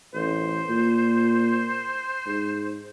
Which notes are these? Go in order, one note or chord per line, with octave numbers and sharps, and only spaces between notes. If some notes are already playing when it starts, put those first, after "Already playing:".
A1 C5
A#2
G#2